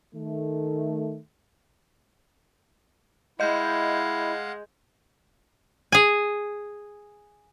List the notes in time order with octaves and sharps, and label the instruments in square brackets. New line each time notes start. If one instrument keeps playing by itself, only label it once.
[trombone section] D#3 A3
[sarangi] G#3 [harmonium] E4 [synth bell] D#5 G6 [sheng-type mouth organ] F5 F#5
[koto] G#4 G#5